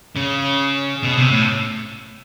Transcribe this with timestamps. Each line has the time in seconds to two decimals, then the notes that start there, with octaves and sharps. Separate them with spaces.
0.17 C#3
1.03 B2
1.17 C3
1.31 A2